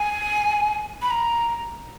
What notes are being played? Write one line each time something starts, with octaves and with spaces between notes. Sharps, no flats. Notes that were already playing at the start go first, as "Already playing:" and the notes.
Already playing: G#5
B5
A#5